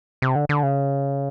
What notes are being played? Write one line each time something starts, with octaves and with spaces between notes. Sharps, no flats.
C3
D3
D3
C#3